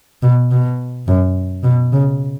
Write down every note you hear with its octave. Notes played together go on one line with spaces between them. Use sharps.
B2
B2
F#2
B2
C#3